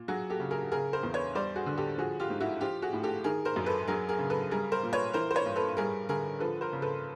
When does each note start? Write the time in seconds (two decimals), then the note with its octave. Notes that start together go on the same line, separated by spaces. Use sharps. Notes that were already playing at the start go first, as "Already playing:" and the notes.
Already playing: A#2
0.08 F#3 F#4 G#4
0.30 G4 A4
0.40 C#3
0.51 G#4 A#4
0.72 C#3 G#4 A#4
0.93 A#4 C5
1.03 E2
1.14 B4 C#5
1.35 G3 C5 D5
1.56 F#4 G#4
1.66 D3
1.78 G4 A4
1.98 F3 F#4 G#4
2.20 F4 G4
2.30 G#2
2.40 E4 F#4
2.61 F3 F4 G4
2.82 F#4 G#4
2.93 A2
3.03 G4 A4
3.24 D#3 G#4 A#4
3.45 A#4 C5
3.56 F#2
3.66 A4 B4
3.87 F#3 G#4 A#4
4.09 G#4 A#4
4.19 C#3
4.30 A4 B4
4.51 G3 G#4 A#4
4.72 A#4 C5
4.83 A#2
4.93 B4 C#5
5.14 E3 A#4 C5
5.31 C5
5.35 B4 C#5
5.46 G2
5.56 A4 B4
5.77 G3 G#4 A#4
6.09 D3 G#4 A#4
6.40 F3 A4 B4
6.61 A#4 C5
6.73 C#3
6.82 A4 B4